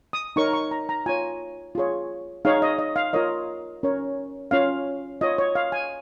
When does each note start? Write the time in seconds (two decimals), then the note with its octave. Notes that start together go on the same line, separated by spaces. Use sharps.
0.13 D#6
0.36 D#4 A#4 C#5 C#6
0.53 C#6
0.71 A#5
0.89 A#5
1.06 F4 C#5 G#5
1.75 F4 G#4 C#5
2.45 D#4 G#4 C#5 F5
2.62 D#5
2.79 D#5
2.96 F5
3.13 F4 A#4 C#5 D#5
3.83 C#4 A#4 C#5
4.51 C#4 F4 C#5 F5
5.21 F4 C#5 D#5
5.38 C#5
5.55 F5
5.72 G#5